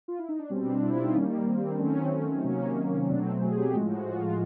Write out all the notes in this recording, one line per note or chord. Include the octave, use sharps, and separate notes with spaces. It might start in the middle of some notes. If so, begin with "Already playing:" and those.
F4
E4
D#4
D4
B2 G3 C4 C#4
D4
E4
F4
D#4
D#3 G3 A#3 C#4
C4
D4
D#3 F#3 A3 C4 C#4
C3 D#3 F#3 A#3 C#4
B2 F#3 A3 C4 D4
G#4
G4
A2 F3 G#3 F#4
F#4
F4